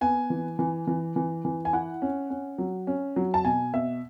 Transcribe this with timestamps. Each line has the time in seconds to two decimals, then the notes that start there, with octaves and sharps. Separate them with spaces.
0.01 B3 G#5
0.30 E3
0.59 E3
0.87 E3
1.16 E3
1.45 E3
1.65 G#5
1.73 E4 F#5
2.02 C#4
2.30 C#4
2.58 F#3
2.87 C#4
3.16 F#3
3.34 A5
3.45 B2 G#5
3.74 B2 E5